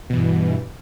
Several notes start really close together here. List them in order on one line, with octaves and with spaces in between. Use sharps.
B2 E3 G2